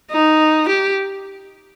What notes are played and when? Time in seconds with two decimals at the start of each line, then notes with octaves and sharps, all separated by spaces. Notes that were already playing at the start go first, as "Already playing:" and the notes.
0.11 D#4
0.68 G4